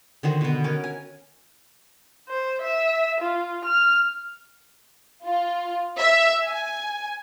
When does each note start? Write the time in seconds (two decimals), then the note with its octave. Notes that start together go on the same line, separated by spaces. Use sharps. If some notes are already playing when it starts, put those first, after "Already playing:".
0.23 D3 D#3 F#4 C5
0.41 B2 B3
0.64 C#4 A#4
0.84 G#5
2.29 C5
2.62 E5
3.21 F4
3.65 F6
5.25 F4
5.99 E5
6.45 G#5